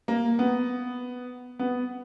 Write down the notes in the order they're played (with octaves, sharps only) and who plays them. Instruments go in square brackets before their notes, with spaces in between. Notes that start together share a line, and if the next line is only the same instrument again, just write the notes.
[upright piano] A#3
B3
B3